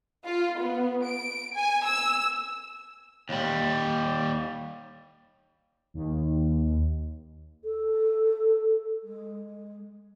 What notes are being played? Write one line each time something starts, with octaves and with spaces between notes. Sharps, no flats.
F4
B3
D7
G#5
E6
D#2 G3
D#2
A4
G#3